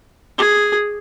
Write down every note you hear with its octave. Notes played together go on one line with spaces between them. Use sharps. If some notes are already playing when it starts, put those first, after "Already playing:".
G#4